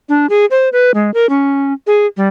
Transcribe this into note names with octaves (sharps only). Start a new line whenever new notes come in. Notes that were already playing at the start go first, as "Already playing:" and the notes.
D4
G#4
C5
B4
G#3
A#4
C#4
G#4
G3